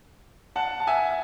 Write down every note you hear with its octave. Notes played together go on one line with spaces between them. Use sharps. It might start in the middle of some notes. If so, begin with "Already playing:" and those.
F#5 A5
A5
E5 G#5